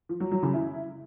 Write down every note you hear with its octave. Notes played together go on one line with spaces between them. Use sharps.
F3
F#3
F#3
C#3
E4